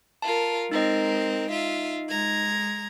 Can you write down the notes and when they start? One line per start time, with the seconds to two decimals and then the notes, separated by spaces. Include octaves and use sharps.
0.22 F4 A#4 A5
0.71 G#3 C4 D#4 A#4 D#5
1.50 F4 E5
2.09 G#3 A#5 G#6